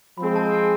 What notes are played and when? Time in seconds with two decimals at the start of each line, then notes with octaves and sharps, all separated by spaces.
0.18 F3 G#3 C4 G#4 B5
0.36 A5
0.54 G#5